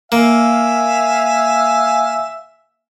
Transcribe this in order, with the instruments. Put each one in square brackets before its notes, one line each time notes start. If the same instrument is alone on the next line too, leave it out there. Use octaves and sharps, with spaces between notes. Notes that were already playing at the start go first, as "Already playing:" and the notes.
[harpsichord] A#3 [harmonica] E5 F5 G#5